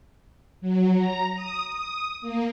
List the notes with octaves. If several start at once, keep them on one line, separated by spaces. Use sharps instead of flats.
F#3
A#5
D#6
D#6
A#3